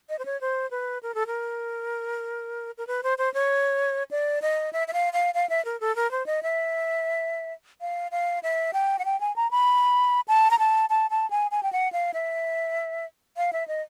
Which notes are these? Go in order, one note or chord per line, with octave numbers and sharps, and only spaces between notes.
D#5
C5
C#5
C5
B4
A#4
A4
A#4
A#4
B4
C5
C5
C#5
D5
D#5
E5
E5
F5
F5
F5
E5
A#4
A4
A#4
C5
D#5
E5
F5
F5
E5
G5
F#5
G5
G#5
A#5
B5
A5
A#5
A5
A5
A5
G#5
G#5
G5
F#5
F5
E5
F5
E5
D#5